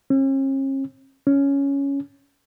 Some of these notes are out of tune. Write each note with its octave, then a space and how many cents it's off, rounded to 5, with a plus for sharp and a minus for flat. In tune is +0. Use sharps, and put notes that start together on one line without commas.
C#4 -45
C#4 +5